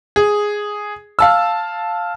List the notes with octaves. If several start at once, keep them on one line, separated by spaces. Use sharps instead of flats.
G#4
F5 A5 E6